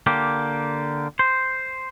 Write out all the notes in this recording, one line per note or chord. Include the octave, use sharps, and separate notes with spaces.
D3 A#3 G4
C5